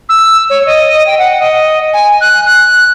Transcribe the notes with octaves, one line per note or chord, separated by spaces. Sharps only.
E6
C#5
D#5
G5
F#5
D#5
G#5
F#6
F#6